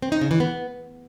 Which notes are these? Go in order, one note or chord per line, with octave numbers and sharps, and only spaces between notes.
C4
D#4
C#3
E3
B3